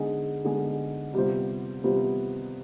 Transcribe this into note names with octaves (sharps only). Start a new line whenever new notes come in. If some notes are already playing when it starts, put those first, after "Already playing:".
Already playing: D3 G#3 B3 D#4 G#4
D3 G#3 B3 D#4 G#4
C3 G3 B3 F4 C5
C3 G3 B3 F4 C5